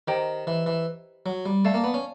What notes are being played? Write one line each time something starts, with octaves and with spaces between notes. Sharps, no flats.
D#3 G4 C5 D#5 G5 A#5
E3
E3
F#3
G3
A3 D5 F5 A5
A#3
B3
C#4